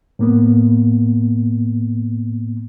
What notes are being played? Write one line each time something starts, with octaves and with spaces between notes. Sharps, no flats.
A2 A#3 B3